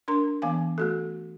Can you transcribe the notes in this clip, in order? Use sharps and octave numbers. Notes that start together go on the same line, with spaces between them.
D4 A#4 A#5 C6
E3 B3 F5 G#5
A3 F#4 A4